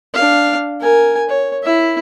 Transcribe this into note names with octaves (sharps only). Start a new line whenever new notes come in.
D4 F5
A#4 G#5
C#5
E4 E5